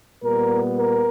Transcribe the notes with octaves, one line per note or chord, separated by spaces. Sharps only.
A#2 G3 B3 A#4
A#4